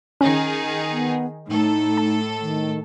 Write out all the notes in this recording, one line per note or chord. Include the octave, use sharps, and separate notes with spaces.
D#3 C#4 D#4 G#4
B3
A2 D#4 A4
A5
D#3